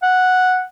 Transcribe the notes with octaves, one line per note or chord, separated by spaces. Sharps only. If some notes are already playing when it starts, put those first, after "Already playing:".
F#5